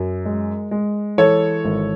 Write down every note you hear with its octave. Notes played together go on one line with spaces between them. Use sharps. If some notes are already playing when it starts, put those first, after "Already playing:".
Already playing: F#2
G#3
G#3
E3 A4 C#5
G#1